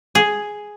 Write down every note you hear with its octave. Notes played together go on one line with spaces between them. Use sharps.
G#4